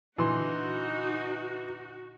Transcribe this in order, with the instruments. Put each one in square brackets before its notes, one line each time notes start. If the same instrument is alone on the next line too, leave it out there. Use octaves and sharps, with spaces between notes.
[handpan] A#2 D3 [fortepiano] E3 C6 [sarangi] D#4 [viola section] F#4